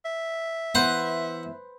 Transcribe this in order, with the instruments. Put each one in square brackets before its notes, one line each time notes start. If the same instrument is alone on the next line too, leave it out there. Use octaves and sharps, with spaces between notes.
[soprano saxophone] E5
[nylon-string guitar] E3 B3 [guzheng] B4 C5 [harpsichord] F#5